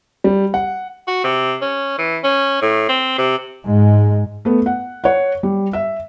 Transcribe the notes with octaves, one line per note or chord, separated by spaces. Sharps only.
G3
F#5
F#4
C3
C#4
E3
C#4
A2
C4
C3
G#2 G#3
A3 B3
F#5
C#5 F#5
G3
E5